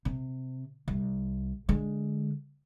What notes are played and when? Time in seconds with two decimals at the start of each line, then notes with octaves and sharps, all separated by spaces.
0.05 C3
0.88 C2
1.69 D3 G#3